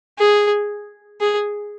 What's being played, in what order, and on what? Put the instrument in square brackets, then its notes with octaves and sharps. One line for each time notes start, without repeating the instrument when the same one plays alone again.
[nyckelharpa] G#4
G#4